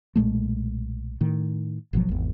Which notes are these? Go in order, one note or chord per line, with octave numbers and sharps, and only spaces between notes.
B1 A#2 G#3 A3
A2 D#3
G#1 B2 F3 F#3
G#1 E2